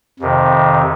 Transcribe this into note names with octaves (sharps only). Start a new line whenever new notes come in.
F2 C3 D#3